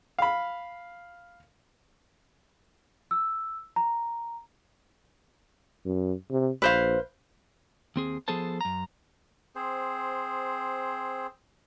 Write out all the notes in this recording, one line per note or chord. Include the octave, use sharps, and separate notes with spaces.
F5 B5
E6
A#5
F#2
C3
A#1 B4 C5 F5
D#2 C4 G#4
F3 B3 G#4 A4 C5 A5
F#2 A#5
C4 G#4 C5